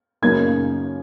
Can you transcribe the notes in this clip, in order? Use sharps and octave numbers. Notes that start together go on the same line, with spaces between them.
F#2 C#3 A#3 D#4 G#6